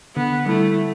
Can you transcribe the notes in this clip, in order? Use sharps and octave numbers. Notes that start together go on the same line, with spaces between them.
D3 B3
G3 A3 E4